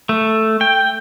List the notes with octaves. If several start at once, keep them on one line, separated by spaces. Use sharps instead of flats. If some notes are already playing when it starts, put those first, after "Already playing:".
A3
G5